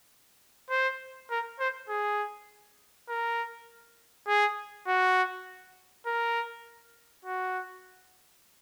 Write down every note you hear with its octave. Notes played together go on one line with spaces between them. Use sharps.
C5
A#4
C5
G#4
A#4
G#4
F#4
A#4
F#4